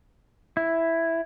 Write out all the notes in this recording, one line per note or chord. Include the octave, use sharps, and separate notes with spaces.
E4